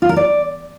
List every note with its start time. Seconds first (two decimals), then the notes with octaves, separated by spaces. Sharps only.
0.02 F4
0.09 A#4
0.16 D5